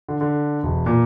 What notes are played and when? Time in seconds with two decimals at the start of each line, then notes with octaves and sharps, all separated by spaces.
0.09 D3
0.21 D3
0.63 E1
0.86 A#2